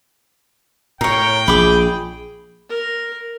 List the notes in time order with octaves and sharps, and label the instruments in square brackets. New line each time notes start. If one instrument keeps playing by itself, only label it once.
[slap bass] A2 [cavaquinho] A#4 C#5 [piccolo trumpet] G5
[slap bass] A#1 [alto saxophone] G#4 [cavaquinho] B5 D6
[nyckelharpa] A#4